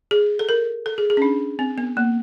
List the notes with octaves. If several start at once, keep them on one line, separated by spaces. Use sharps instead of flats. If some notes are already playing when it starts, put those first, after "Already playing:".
G#4
A4
A#4
A4
G#4
G#4
C#4
D4
C4
B3
A#3